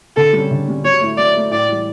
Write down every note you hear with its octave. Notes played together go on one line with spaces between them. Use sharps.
D3 A4
G3 C#4
D3
G3 C#4
F#3 C#5
A3 E4
F#3 D5
A3 E4
A2 D5
E3 G3